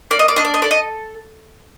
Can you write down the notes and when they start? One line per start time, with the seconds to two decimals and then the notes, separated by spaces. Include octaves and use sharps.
0.11 A#3 D5
0.19 D#5
0.28 D5
0.36 D4 D#5
0.45 D5
0.54 D#5
0.62 A4 D5
0.71 D#5